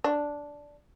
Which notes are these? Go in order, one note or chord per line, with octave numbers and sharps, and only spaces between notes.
D4